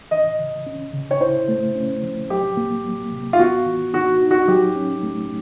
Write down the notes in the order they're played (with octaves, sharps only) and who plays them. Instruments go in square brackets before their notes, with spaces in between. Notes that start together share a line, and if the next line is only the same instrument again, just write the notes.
[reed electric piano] E3 [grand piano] D#5
[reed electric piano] C#3
C#4
C#3
[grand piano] C#5
[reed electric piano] E4 [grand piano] C5
[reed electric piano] A3
C#4
F3
[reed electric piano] F#3 [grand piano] G4
[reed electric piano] A#3
F#3
C3
[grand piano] F4
[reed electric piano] B3 [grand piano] F#4
[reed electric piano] E3
[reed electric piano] D#4 [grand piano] F#4
[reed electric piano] D#4
[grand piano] F#4
[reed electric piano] F#3 [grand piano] G4
[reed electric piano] C#4
A3